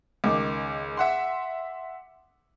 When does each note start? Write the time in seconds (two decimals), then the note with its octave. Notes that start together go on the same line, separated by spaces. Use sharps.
0.24 C#2 D#3 D6
0.97 E5 F#5 C6